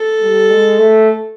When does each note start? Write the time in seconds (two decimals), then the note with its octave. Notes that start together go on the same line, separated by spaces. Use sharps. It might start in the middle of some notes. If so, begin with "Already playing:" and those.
Already playing: A4
0.21 G3
0.50 G#3
0.79 A3